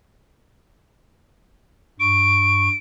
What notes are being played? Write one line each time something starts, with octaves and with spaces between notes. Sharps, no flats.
G2 C#6 D7